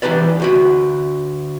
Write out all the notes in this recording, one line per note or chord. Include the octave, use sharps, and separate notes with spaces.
E3 D#4 G4 B4 D5
D2 F#4 B5